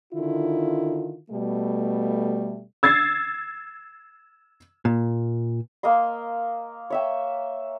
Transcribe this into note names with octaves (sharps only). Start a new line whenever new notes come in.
D3 D#3 E4 F4
B2 G3 A3
E6 G#6 A6 C7
A#2
A#3 A#4 D#5 C6
C#5 E5 G5